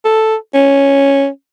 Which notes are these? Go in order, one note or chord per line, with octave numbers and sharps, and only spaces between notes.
A4
C#4